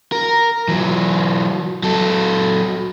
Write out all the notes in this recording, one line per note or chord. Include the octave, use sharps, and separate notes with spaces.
A#4
E3 F#3
F#3 A4